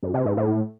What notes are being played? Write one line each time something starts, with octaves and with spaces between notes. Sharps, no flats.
F#2
C3
G#2
A2